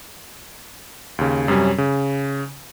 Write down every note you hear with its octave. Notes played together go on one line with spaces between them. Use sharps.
D#2 C#3
F#2 C3 G3 C#4
C#3